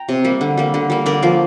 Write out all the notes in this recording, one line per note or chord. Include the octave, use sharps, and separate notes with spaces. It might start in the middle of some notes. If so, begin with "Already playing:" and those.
Already playing: G5 A#5
C3
G3 A#3
D3
G3 A#3
D3
G3 A#3
D3 A#4 D5
F3 A#3